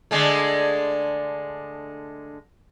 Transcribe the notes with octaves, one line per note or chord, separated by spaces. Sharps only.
D3 G#3 A3